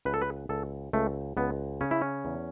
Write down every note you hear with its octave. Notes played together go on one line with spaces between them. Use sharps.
C#2 B4
A4
B4
C#2 A4
C#2 A3
C#2 B3
C#3 C#4
E4
C#4
E2